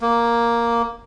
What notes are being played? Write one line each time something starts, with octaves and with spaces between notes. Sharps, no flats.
A#3